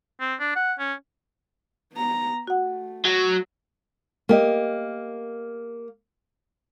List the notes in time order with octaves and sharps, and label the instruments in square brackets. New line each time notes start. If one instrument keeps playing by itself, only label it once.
[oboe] C4
D4
F#5
C#4
[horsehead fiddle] B3 A#5
[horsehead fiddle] A3 [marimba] F#4 F#5
[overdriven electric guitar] F#3
[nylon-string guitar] A#3 G4 D#5